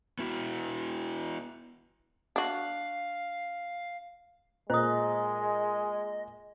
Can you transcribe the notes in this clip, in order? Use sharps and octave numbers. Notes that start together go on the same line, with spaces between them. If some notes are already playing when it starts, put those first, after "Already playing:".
B3 E4 F#4
D4 F#4 F5
A#2 G#3 C5 D#5 D#6